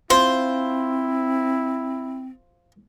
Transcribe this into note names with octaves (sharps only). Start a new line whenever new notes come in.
C4 E4 F4 C5